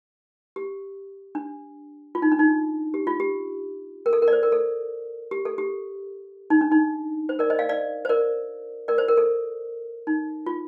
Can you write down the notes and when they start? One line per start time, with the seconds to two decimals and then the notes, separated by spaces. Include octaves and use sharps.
0.56 G4
1.35 D4
2.15 F4
2.22 D#4
2.32 D4
2.39 D#4
2.94 G4
3.07 F4
3.20 G4
4.06 A#4
4.13 A4
4.22 A#4
4.28 D5
4.33 C5
4.43 A#4
4.52 A4
5.31 G4
5.45 A4
5.58 G4
6.50 D#4
6.61 D4
6.72 D#4
7.29 C5
7.39 A#4 D5
7.50 C5 D#5
7.59 D5 F5
7.69 D5 F5
8.05 C5
8.09 A#4 D5
8.88 A#4 D5
8.98 C5
9.08 A#4
9.18 A4
10.07 D#4
10.46 F4